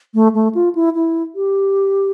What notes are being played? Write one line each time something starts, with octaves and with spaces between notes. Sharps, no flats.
A3
A3
F4
E4
E4
G4